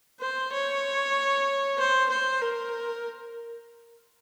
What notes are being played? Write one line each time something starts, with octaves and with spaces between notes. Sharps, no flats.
C5
C#5
C5
C5
A#4